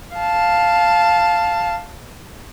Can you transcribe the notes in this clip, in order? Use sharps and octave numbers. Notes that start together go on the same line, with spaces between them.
F5 A5